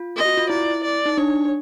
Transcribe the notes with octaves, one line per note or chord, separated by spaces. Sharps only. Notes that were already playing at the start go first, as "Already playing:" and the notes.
Already playing: F4
D#5
F#4
F4
E4 D5
D5
D#4
D4 C#5